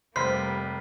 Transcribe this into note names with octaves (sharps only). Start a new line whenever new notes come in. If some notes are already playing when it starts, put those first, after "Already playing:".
F1 G3 A#3 C5 B5 F6 B6 C7